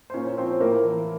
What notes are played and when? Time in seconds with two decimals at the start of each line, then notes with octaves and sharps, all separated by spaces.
0.10 C5
0.14 A#2 C#4 C#5
0.37 F3 C4 C5
0.60 A2 A#3 A#4
0.84 E3